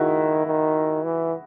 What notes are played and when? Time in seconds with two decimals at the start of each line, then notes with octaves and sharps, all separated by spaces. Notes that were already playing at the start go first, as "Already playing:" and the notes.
Already playing: D#3 E4 F#4 G#4
0.46 D#3
1.03 E3